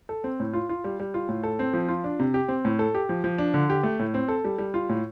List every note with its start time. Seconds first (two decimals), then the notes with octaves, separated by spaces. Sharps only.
0.09 A4
0.24 C4
0.40 A2
0.53 F4
0.69 F4
0.84 G3
1.00 G3
1.14 F4
1.28 A2
1.43 A4
1.59 C4
1.73 F3
1.88 F4
2.04 D4
2.19 C3
2.34 G4
2.48 C4
2.65 A2
2.79 A4
2.95 G4
3.09 F3
3.24 F3
3.38 D4
3.54 D3
3.70 G4
3.83 A3
3.99 A2
4.14 C4
4.28 A4
4.45 G3
4.58 G3
4.74 F4
4.89 A2